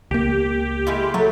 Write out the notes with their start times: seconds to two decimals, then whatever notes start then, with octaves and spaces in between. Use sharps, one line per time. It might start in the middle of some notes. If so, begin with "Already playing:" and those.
0.11 C#2 A#3 G4
0.87 G#3 E4 F4
1.14 F#3 A3